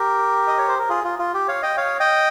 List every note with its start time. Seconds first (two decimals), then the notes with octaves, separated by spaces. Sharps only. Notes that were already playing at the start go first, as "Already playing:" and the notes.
Already playing: G4 A#4
0.47 D#5
0.58 C#5
0.68 C5
0.79 A#4
0.89 F4 G#4
1.04 F4
1.19 F4
1.34 G4
1.48 C#5 F5
1.63 D#5 G5
1.77 C#5 F5
2.00 D#5 G5